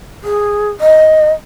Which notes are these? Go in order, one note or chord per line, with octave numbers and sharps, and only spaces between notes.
G#4
D#5